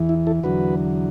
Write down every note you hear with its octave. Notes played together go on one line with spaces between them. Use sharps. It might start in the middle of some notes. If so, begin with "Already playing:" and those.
Already playing: E2 E3
E4
E4 A4
E2 D3 F#3 F#4 B4